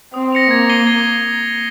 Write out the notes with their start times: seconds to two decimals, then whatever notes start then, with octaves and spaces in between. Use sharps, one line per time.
0.14 C4 D#6
0.32 A#6 C#7 F7
0.50 A#3 G#6
0.70 C7 D#7 G7
0.87 G#6